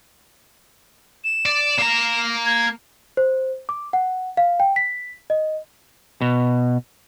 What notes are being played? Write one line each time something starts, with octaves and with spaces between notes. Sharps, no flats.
E7
D5
A#3 A#5
G#6
C5
D6
F#5
F5
G5
B6
D#5
B2